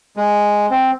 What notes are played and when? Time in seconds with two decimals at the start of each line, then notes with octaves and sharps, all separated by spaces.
0.17 G#3
0.70 C4